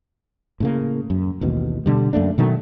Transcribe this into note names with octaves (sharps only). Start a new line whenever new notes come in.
A2 C#3 A#3
F#2
A1 D#2 B2
B2 D3 G3
F#2 A3 A#3 D4
B2 D#3 F#3 A3